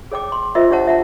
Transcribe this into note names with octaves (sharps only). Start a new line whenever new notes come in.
G#4 C#5 G5 D6
C6
F4 A#4 C5 D#5 E5 C6
D4 G4 C5 C#5 F#5 A5
E5 F#5 A5